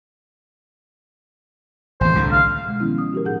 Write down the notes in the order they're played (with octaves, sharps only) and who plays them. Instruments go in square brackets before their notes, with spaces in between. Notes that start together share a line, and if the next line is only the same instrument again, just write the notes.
[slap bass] A1 D#2 [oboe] C5
[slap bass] C2 A2 D3
[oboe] F5
[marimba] B2 G#3
D#3 F3 B3 C#4 E4
F3 D#6
F#4 G4 A#4
A2 D#4 G#4 F#5 G6